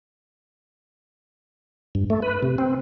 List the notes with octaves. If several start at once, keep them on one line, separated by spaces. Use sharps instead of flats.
G2
A3
B4
C3
C4